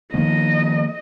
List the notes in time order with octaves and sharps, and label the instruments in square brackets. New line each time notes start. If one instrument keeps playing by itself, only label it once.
[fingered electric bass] D#3 F3 A#3 [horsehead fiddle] D#5